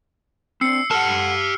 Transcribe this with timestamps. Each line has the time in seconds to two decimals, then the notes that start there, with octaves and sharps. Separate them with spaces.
0.61 C4 D4 E6 C7 C#7
0.91 G4 A4 F#5 A5 F6